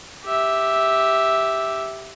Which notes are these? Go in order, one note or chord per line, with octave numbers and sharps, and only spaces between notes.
G4 E5